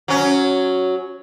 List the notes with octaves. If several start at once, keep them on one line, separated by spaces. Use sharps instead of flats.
F#3 C#4